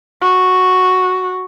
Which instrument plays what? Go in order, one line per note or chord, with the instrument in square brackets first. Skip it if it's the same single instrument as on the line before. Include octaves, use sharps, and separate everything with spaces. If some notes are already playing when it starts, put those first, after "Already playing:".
[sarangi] F#4